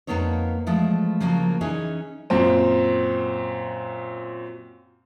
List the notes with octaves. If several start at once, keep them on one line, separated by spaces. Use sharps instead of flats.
F2 C#3 A#3 B3 D#4 C#5
E3 F3 G#3 A3
C#3 F3 F#3 A#3
E3 C#4 D#4 G#4
F#2 A#2 C4